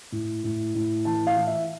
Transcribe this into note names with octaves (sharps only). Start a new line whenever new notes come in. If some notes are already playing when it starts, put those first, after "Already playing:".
A2
A2
A2
E3 A5
F5
E3
E5